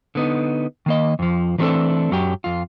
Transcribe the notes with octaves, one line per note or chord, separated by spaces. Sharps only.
D3 B3 D#4
D#3 A#3 D#5
F2 F3
E3 F#3 A3 C4 D4 A4
F#2 F#3 G4
F2 F4